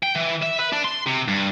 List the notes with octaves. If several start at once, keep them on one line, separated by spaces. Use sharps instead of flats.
G5
E3
E5
B4
D4
C6
C3
G2